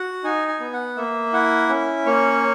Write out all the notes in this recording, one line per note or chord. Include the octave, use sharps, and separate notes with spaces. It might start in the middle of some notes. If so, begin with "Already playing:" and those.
Already playing: F#4 F#5
D#4 G#5
G#5
B3
F#5
A#3 E5
E4 F#5
C#4
A#3 C#5